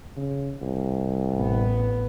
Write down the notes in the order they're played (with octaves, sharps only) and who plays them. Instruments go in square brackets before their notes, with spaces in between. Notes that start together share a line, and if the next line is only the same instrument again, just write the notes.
[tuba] C#3
C2
[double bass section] A1 B3